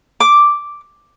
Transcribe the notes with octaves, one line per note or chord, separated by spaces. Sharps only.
D6